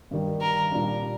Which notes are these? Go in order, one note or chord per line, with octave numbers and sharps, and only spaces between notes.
G2 D#3 G3
A#4
A#2 G3 D4